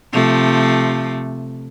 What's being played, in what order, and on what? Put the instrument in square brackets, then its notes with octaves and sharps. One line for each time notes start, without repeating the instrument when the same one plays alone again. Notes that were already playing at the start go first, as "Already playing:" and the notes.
[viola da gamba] C3 F3 A3